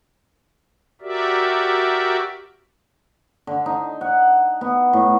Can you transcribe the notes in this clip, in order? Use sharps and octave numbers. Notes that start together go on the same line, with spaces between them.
F#4 G4 A#4 D5 E5
D3
D#4
F#5
B3
A2